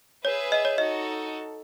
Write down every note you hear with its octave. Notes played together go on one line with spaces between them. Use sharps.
G#4 B4 C#5 E5
D#5
C#5
D#4 F#4 A4 D#5